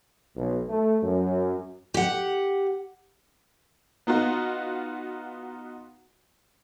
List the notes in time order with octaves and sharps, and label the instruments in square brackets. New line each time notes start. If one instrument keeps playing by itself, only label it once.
[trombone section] B1
A3
F#2
[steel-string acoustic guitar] G4 F#5
[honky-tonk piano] B3 D#4 F4 F#4